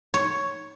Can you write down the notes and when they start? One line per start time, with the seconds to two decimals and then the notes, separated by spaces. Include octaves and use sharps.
0.14 C#5